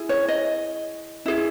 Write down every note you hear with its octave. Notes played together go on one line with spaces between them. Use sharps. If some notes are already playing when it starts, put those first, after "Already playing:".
Already playing: E4 G#4
C#5
D#5
E4 G#4